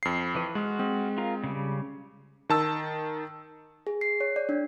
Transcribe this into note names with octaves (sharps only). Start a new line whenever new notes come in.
F2 C7
E3 B4
G#3 F#4 F6
G#3 C4
F4 A#4 F5
C#3 G3
D#3 A5 E6
G#4
C7
C#5
D5
D4